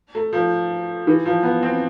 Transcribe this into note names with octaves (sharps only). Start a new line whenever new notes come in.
A3
F3
E3
F3
B3
C4